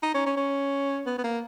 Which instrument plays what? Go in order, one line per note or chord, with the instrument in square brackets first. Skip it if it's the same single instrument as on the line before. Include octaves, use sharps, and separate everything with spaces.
[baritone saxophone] D#4
C#4
C#4
C#4
B3
B3
A#3